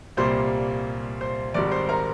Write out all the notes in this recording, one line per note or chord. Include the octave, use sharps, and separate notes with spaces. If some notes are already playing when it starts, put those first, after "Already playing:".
C2 A#2 G3 A#3 C5 C6
C5 C6
G#1 G#2 G3 D5 D6
C5 C6
A#4 A#5